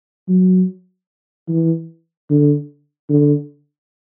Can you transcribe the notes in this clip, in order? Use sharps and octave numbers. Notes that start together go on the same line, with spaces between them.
F#3
E3
D3
D3